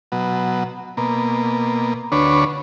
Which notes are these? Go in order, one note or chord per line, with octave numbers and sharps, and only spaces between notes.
B2 F#3
B2 A#3
D2 D4 B4 C#5